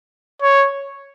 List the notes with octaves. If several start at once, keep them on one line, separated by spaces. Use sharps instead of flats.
C#5